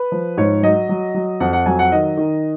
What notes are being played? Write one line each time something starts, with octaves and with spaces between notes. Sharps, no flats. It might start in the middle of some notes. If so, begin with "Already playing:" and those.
Already playing: B4
F3
G#2 C#5
F#3 D#5
F#3
F#3
F2 F#5
F#5
F#3 G#5
F#5
D#3 D#5
D#3